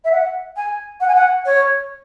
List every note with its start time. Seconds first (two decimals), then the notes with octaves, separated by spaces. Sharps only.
0.04 E5
0.11 F#5
0.56 G#5
1.00 F#5
1.07 G#5
1.14 F#5
1.45 C#5